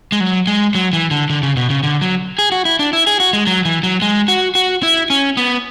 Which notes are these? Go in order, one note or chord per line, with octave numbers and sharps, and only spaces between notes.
G#3
F#3
G#3
F#3
E3
D3
D3
C#3
B2
C#3
D3
F#3
G#4
F#4
E4
D4
E4
G#4
F#4
G#3
F#3
E3
F#3
G#3
F#4
F#4
E4
C#4
B3